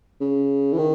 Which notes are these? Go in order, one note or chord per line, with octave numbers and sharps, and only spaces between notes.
C#3
E3
D#3